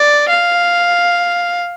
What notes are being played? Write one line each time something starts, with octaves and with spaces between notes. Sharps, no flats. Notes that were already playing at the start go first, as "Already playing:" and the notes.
Already playing: D5
F5